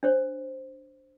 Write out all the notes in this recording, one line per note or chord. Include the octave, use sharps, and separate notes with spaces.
D4 C5 C#5